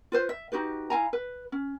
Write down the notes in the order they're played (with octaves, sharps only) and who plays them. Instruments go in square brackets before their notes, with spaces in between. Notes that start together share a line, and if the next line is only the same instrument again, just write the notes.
[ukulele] F4 B4 C5
E5
D#4 F#4 G4 B4
E4 F5 G#5 A#5
B4
C#4